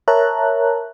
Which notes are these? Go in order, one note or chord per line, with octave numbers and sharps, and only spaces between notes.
A#4 C#5 E5 A5 A#5 F#6